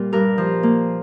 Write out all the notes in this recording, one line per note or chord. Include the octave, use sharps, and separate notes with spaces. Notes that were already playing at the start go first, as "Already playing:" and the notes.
Already playing: A#2 G3 A#3
G2 A#4
F3
A#3